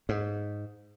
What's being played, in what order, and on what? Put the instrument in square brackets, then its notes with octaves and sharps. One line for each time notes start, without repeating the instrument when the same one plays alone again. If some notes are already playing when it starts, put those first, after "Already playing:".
[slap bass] G#2